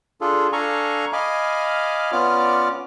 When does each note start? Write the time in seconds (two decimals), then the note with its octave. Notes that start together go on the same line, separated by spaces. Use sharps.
0.21 D4 F4 G#4 A4
0.53 D4 A4 F5 G#5 A#5 C#6
1.13 D#5 F5 G#5 B5 D6 F6
2.12 B3 C#4 F4 D5 D6 F6